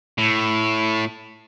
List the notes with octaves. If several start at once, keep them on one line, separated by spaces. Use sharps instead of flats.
A2